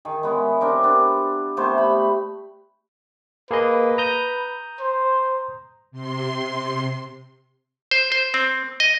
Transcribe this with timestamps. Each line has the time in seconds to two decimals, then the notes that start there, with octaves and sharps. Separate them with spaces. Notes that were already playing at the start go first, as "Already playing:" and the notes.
0.05 D#3 G#4
0.23 G#3 B3 C#4 E4
0.61 C4 D4 G4 A#4
0.84 B3 D4
1.57 C3 A3 B3 C5
1.78 B5
3.51 A#3 G#4 B4 D#5
3.98 A#5 D#6 G6
4.80 C5
5.91 C3 C6
7.91 C5
8.12 C5
8.34 C4
8.80 D#5